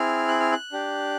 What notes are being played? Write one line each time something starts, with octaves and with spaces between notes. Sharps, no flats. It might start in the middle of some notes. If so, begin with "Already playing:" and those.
Already playing: C4 E4 G#4 F6
F#6
F6
F#6
D4 G4